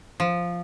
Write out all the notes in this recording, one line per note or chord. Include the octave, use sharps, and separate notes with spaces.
F3